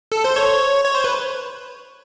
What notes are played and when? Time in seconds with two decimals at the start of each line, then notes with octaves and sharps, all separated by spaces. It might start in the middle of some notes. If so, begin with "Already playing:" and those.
0.12 A4
0.24 C5
0.36 C#5
0.85 C#5
0.95 C5
1.04 B4